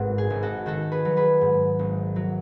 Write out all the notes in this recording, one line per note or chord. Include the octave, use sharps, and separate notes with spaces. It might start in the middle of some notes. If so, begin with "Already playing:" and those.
Already playing: G#1 G#2 F#4 B4
G#4
G#1
F#4 A4
D#3 F#4 A4
G#4 B4
F#3
G#4 B4
G#2
G#1
F#3